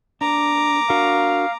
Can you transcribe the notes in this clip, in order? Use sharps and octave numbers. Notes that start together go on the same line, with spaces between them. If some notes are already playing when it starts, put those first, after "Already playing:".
D4 A#5 D6
D4 F#4 A#4 F5